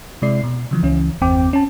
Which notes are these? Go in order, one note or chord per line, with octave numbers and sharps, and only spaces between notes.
C3 G#3 E4 D5 C7
B2
C#3 E3 F3
C#2 E3 C#4
G1 E2 C4 G5 D6
C#4 A5